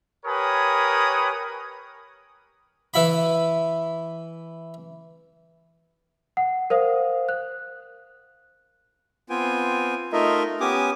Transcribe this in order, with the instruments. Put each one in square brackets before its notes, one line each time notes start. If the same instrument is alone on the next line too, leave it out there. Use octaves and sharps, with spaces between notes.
[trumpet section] G4 A#4 B4 C#5 G#5 D#6
[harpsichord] E3 E4 B5
[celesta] F#5
A#4 C5 F5 D#6
F#6
[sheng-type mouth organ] B3 C4 F4 G5 G#5
A3 D#4 F4 A#4 D#5 E5
B3 C#4 G4 G#5 D6 D#6